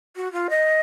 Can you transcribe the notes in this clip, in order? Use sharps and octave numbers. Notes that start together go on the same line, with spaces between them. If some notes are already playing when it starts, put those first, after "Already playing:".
F#4
F4
D#5